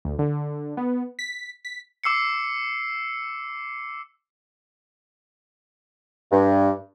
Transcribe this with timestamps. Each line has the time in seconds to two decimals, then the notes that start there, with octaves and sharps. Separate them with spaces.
0.05 D2
0.19 D3
0.77 B3
1.19 B6
1.65 B6
2.04 D6 E6 C7 C#7
6.32 G2